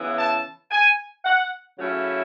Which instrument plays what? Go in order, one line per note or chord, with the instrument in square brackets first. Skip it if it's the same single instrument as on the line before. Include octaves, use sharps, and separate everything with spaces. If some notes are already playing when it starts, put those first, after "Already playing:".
Already playing: [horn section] C#3 E3 B3 E4
A5
G#5
F#5
C#3 F#3 A3 C#4 E4